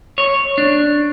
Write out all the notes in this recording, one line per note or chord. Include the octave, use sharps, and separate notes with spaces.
C#5
D4